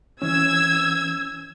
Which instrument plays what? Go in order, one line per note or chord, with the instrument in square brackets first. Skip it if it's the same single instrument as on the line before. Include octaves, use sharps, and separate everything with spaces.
[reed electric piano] E3 C#4 [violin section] E6 G#6